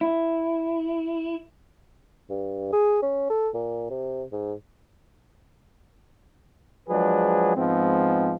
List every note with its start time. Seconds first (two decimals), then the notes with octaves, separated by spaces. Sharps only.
0.01 E4
2.29 G2
2.73 G#4
3.02 C#4
3.30 A4
3.54 A#2
3.90 C3
4.32 G#2
6.89 F3 F#3 G#3 D4 G#4 B4
7.56 G#2 F3 G#3 B3 C4